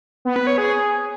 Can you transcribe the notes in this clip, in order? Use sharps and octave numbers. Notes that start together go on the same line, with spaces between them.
B3
B4
C#5
G#4